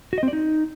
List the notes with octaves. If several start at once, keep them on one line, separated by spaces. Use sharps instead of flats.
F#4
D#5
C4
D5
D#4